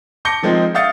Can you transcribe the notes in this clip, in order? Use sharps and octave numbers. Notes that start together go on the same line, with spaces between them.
A5 D6 G6 A#6 C#7 G7
D#3 F3 G#3 C4 D#4
E5 F5 D#6 G6 A6 C#7